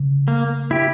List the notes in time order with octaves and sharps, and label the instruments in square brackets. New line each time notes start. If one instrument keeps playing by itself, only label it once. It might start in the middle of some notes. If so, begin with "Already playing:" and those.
Already playing: [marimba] C#3
[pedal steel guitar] A#3
E4 G4